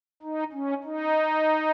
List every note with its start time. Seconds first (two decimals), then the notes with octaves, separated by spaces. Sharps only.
0.22 D#4
0.52 C#4
0.84 D#4